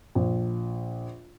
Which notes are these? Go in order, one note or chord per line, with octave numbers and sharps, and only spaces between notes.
A#1